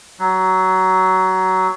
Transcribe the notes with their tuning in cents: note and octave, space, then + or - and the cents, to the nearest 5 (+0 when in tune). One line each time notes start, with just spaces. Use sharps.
F#3 +15